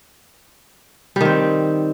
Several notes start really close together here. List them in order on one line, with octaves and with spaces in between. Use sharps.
G3 D#3 C4